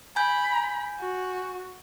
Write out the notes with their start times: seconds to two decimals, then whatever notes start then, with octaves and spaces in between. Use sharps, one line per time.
0.16 G#5 B5 G6
1.00 F#4